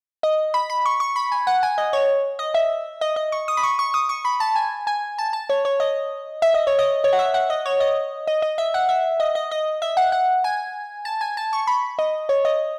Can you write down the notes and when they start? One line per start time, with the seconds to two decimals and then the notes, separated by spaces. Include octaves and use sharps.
0.23 D#5
0.54 B5
0.70 B5
0.85 C#6
1.00 C#6
1.16 B5
1.32 G#5
1.47 F#5
1.63 G#5
1.78 D#5
1.93 C#5
2.39 D#5
2.54 E5
3.01 D#5
3.16 D#5
3.32 C#6
3.48 D#6
3.57 B5
3.63 C#6
3.79 C#6
3.94 D#6
4.09 C#6
4.25 B5
4.40 A5
4.55 G#5
4.87 G#5
5.18 A5
5.33 A5
5.49 C#5
5.65 C#5
5.80 D#5
6.42 E5
6.54 D#5
6.67 C#5
6.79 D#5
7.04 C#5
7.13 F#5
7.19 E5
7.34 F#5
7.50 D#5
7.66 C#5
7.80 D#5
8.27 D#5
8.42 D#5
8.58 E5
8.74 F#5
8.89 E5
9.20 D#5
9.35 D#5
9.51 D#5
9.82 E5
9.97 F#5
10.12 F#5
10.44 G#5
11.05 A5
11.21 G#5
11.37 A5
11.53 C#6
11.67 B5
11.99 D#5
12.29 C#5
12.45 D#5